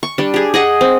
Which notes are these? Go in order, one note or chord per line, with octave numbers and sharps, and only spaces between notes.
C#6
G3 D4
G4 G#4
G#4 D#5 F#5
C4